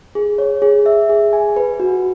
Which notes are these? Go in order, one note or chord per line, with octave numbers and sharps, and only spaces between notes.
G#4
C#5
G#4
E5
G#4
G#5
B4
F#4